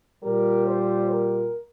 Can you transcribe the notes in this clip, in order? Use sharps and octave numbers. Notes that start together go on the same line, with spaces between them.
A#2 G3 A#4
C5
A#4